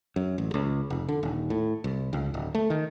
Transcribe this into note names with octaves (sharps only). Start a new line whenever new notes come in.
F#2
A1
C#2
F1
D3
D#1
A2
C2
C#2
D1
A3
D#3